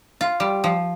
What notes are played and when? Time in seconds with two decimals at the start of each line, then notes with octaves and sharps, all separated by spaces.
0.21 F4
0.40 G3
0.64 F3